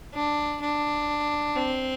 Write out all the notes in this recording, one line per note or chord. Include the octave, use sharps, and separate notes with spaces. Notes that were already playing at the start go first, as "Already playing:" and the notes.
D4
D4
C4